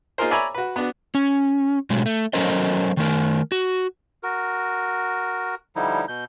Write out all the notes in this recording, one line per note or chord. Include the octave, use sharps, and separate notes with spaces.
A#3 D#4 F4 G#4 A#4 C5
C#5 D5 E5 G#5 A#5 B5
F#4 B4
B3 D4 F#4
C#4
B2 F#3 G#3 A3
A3
F#3 C#4 A4 A#4 C5 D#5
D#3 A3 A#4
F#4
F#4 A#4
D3 F3 G3 D#4 E4
B2 G6